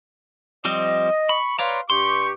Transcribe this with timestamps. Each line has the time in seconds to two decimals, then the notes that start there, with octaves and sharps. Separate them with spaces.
0.65 F3 G3 C4 D#5
1.29 B5 C#6
1.59 B4 C#5 D5 F5 A#5 C6
1.90 G2 G4 C6 C#6